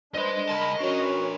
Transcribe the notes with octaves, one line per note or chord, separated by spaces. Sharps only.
D4 B4 C5 D#5 C6
C#2 A#4 A5 B5
C#4 D4 F#4 A#4 B4 C#5